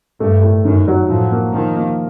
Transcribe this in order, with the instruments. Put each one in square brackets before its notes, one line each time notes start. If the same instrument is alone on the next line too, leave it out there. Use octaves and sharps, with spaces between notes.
[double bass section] G2 [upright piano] A3
[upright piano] A2
[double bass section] F#2 [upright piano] D#3
[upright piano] F#3
[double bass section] A2 [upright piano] F3
[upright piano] A#3
[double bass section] D#3 [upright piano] F3
[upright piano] A#3